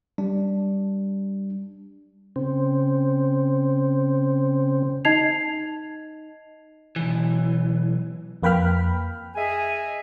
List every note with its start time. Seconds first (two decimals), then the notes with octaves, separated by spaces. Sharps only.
0.18 G3 D4
2.36 C#3 C4
5.05 D#4 D#5 A5 G#6 C7 F7
6.96 B1 E3
8.43 F2 A#3 B4 G5 B5 F6
9.36 G#4 D#5 E5 G#5